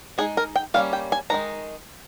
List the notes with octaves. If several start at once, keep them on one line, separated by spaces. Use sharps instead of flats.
G#3 D#4 G#4
A#4
G5
G3 A#3 C#4 F5
G5
G#5
D#3 G#3 D#4 A#5